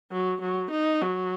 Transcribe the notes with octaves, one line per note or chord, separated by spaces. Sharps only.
F#3
F#3
D#4
F#3